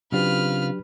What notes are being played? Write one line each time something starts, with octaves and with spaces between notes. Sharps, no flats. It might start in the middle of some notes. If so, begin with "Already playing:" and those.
C#3 F#3 C4 D4 F4 G4 B4 F6